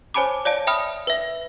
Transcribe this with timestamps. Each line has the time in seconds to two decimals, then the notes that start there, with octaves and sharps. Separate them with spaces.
0.14 C5 C#5 G#5 A5 B5 D6
0.45 C#5 D5 F5 A5
0.67 E5 G5 B5 D#6 F6
1.07 B4 E5